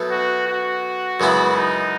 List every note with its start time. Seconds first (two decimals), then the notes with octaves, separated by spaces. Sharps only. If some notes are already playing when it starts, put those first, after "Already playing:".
Already playing: B2 F#3 A3
0.11 F#4
0.47 F#4
1.20 F#2 C#3 G#3 B3 E4
1.56 D#4